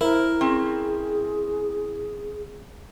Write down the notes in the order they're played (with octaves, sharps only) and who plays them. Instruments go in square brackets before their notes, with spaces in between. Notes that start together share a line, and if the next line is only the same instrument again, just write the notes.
[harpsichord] E4 [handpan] A#4 [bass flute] C5
[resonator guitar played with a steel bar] C4 C#4 [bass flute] G#4